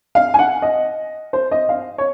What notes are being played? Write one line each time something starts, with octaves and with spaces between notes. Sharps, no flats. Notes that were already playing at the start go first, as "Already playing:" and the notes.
F5
G#5
F#5
D#5
C5
D#5
F5
C#5